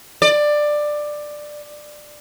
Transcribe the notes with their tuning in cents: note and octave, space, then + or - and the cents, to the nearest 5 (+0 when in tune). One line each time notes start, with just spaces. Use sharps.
D5 +15